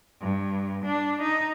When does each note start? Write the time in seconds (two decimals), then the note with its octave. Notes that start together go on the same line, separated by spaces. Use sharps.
0.22 G2
0.86 D4
1.21 D#4